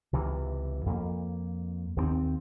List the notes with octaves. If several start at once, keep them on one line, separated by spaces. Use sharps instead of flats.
C#2 C3 E3
F2 A#3
D#2 A3 C4